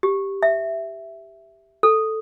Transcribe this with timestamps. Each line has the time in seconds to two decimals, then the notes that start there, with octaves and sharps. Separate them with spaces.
0.03 G4
0.43 E5
1.83 A4